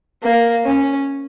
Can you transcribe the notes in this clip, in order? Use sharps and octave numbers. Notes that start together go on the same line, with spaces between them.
A#3
C#4